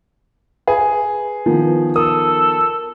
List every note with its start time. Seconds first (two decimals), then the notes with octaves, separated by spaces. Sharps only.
0.68 G#4 B4
1.46 D#3 F3 B3
1.96 A4 A#4 D#6